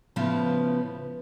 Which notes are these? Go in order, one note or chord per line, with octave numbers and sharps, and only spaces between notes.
A2 C#3 F3 B3